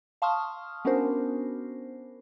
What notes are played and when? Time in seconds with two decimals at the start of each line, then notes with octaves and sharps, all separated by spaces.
0.22 F5 A5 C6 C#6 D#6 F6
0.85 B3 C#4 D4 F#4 A#4 C5